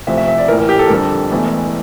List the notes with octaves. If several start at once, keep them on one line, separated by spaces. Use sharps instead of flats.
D2 C3 F3 E5
E5
E5
D5
A#1 A2 E3 A#4
A#4
G4
A4
A#4
F2 D3 G3 A4
E1 E2 E3 A3